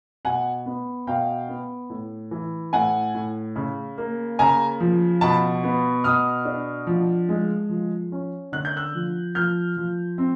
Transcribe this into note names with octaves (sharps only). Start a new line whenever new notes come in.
B2 F#5 G#5
B3
B2 F5 G5
B3
A2
E3
A2 F#5 G#5
A2
C#3
A#3
C#3 G#5 A#5
F3
B2 A5 B5
B3
B2 D#6 F6
D4
F3
G#3
F3
C#4
D3 F#6
G6
E6 F#6
F3
F3 F6 G6
F3
C4